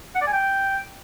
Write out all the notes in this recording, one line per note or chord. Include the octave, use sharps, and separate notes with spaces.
F#5
D5
G#5
G5